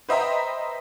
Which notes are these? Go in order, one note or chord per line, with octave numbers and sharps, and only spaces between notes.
B4 C5 D#5 E5 G5 A#5